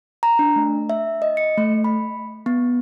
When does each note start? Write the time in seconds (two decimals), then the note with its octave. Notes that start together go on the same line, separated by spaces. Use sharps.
0.23 A#5
0.39 D4
0.56 A3
0.90 E5
1.22 D#5
1.37 C#7
1.58 A3
1.84 B5
2.46 B3